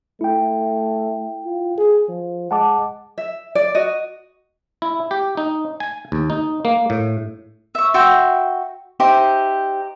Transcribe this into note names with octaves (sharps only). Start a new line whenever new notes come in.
A3 E4 G5
F4
G#4
F3
G#3 F#5 A5 D6
E5
D5
F#4 D#5
E4
G4
D#4
G#5
D#2
D#4
A#3
A2
E5 C#6
F#4 E5 G5 C6
D#4 G4 C5 E5